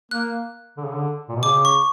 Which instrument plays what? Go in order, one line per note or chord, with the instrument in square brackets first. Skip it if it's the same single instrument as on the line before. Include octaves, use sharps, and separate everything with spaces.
[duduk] A#3 [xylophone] F#6
[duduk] D3
C#3
D3
A#2
B2
[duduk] C#3 [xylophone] D6
[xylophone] C#6